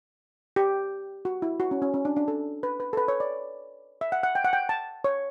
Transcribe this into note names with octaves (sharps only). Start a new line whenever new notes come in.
G4
F#4
E4
F#4
C#4
C#4
C#4
D4
D4
A4
B4
B4
A4
B4
C#5
D5
E5
F#5
F#5
G5
F#5
G5
A5
C#5